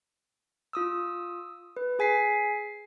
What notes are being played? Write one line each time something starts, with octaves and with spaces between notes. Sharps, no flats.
F4 D#6 E6
B4
G#4 G#5 B6 C7